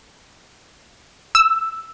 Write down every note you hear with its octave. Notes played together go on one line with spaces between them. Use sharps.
E6